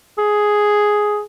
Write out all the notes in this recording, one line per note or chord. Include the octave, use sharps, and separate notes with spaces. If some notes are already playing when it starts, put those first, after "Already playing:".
G#4